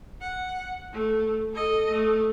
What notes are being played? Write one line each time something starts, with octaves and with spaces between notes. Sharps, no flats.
F#5
A3
A4 D#5
A3